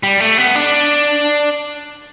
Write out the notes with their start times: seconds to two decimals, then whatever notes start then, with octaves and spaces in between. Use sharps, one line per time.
0.03 G3
0.20 A3
0.37 B3
0.55 D4